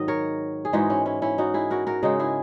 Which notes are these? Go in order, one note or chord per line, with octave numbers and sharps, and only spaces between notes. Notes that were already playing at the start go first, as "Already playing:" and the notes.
Already playing: G#2 D#3 F#3 D#5
A#4 C#5
G#4
G#2 E3 G#3 D#4 F#4
C#4 E4
C#4 E4
C#4 E4
D#4 F#4
E4 G#4
F#4 A#4
F#4 A#4
C#3 G#3 D#4 F#4
E4 G#4